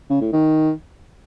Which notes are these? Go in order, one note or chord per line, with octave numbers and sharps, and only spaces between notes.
C#3
A2
D#3